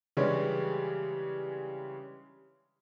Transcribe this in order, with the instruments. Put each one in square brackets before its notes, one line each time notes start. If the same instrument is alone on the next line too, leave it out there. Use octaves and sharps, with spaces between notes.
[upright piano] C#3 E3 G3 G#3 C#4 D4